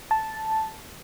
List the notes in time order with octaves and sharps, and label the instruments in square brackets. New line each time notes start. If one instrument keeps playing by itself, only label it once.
[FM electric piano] A5